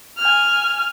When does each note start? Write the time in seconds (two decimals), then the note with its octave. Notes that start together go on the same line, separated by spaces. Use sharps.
0.17 G#5 F6